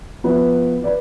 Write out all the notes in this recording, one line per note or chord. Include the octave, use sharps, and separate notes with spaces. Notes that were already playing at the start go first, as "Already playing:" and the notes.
F3 B3 E4 B4
B4 D5